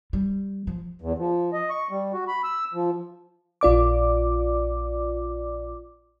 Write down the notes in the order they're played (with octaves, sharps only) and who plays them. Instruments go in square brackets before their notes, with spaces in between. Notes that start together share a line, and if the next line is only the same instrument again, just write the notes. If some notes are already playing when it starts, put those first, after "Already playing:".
[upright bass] G3
F3
[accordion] E2
F3
D#5
C#6
G3
F#4
B5
E6
F3
[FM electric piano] A#1 F4 D5 D6